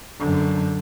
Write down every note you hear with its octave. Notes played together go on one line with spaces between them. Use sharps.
F#2 D3